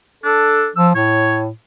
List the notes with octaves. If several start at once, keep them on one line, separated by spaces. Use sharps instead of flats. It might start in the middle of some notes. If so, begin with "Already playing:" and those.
D4 A4
F3 E6
A2 C#5